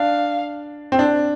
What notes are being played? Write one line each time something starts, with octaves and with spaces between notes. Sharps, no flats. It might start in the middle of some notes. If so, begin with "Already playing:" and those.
Already playing: D4 F5
C4
D4